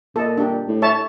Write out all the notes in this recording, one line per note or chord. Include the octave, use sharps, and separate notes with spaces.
A#2 A4 D#5
D4 G4
A2
C#5 E5 A5